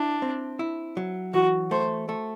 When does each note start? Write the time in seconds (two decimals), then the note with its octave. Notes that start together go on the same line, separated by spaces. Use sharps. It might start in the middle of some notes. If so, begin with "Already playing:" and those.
Already playing: D4 E4
0.22 C4
0.59 E4
0.97 F#3
1.34 E3 F#4
1.71 A3 C5
2.09 A3